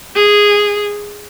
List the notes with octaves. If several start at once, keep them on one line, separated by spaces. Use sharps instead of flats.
G#4